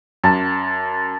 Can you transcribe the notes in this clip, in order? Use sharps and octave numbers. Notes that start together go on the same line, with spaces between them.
F#2 A5